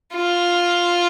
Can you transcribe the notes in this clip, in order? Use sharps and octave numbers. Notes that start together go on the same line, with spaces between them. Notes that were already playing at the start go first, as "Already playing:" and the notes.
F4